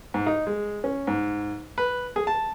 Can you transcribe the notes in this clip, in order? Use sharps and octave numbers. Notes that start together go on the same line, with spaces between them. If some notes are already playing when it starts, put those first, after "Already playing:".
G#2
D#4
G#3
C#4
G#2
B4
G#4
A5